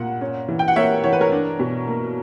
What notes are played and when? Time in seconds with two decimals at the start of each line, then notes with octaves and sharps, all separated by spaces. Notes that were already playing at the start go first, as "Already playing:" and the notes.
Already playing: A#2 F#5
0.21 C#4
0.48 E3
0.59 G5
0.68 F#5
0.76 A#3 C#5 E5
1.04 E3 C#5
1.13 B4
1.21 A#4 C#5
1.32 D4
1.59 B2
1.87 A#3